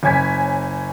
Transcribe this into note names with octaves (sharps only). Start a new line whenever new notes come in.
F#1 C#5 G#5 G#6 B6